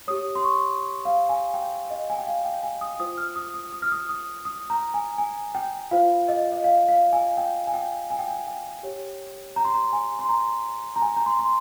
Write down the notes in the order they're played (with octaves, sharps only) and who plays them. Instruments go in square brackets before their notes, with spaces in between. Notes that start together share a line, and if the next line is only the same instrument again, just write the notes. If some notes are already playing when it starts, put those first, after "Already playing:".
[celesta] G4 C#5 D#6
C6
C#6
F5
G#5
G5
D#5
G#5
G5
F5
G5
G#5
D#6
F4 C5 D#6
F6
D#6
D#6
D#6
F6
D#6
D#6
D#6
A#5
G#5
G#5
G5
F4 C5 F5
D#5
D#5
F5
F5
G#5
G5
G#5
G5
G#5
G5
G#5
G5
G4 C#5
A#5
C6
A#5
G#5
C6
A#5
A#5
G#5
A#5
C6
C6